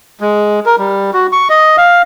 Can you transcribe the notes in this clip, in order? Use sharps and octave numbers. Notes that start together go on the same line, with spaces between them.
G#3
A#4
G3
F#4
C#6
D#5
F5